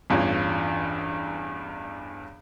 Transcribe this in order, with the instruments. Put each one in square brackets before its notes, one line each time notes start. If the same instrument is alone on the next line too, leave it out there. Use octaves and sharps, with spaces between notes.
[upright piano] A1 E2 G2 F4 C#5